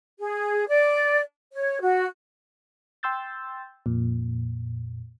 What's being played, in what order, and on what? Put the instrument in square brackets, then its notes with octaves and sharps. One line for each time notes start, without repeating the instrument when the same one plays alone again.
[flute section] G#4
D5
C#5
F#4
[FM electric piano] G5 C6 E6 G6 A6
F2 A#2